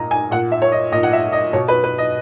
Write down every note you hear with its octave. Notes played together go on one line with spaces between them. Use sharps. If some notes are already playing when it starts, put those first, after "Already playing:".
Already playing: A#2 D#5 A#5
G#5
A#2 F#5
E5
C#5
D#5
A#2 D#5
F#5
E5
D#5
B2 C#5
B4
B4
D#5